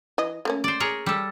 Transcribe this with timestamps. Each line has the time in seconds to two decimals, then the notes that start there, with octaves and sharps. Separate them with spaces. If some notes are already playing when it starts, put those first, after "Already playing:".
0.18 E3 D#5
0.45 A3 A#3 C#4
0.64 C5 D5
0.80 G#4 A#4 C#5
1.06 G3 A4